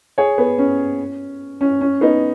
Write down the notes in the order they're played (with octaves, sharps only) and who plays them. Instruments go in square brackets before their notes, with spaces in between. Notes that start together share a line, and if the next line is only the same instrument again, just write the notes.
[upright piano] G#4 C#5
B3
C#4
C#4
C#4
B3 D#4